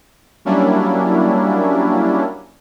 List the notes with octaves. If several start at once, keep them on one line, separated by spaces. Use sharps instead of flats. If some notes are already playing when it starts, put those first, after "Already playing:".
F#3 G3 A#3 C#4 D4 E4